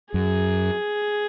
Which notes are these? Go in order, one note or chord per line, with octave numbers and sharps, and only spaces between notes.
F#2 G#4